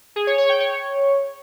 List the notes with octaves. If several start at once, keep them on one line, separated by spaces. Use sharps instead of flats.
G#4
C#5
C#5
G5
C#5